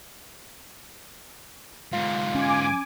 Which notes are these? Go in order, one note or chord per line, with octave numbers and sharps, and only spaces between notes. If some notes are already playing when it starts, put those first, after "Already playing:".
G#2 D3 F4
C#4 G#5 D6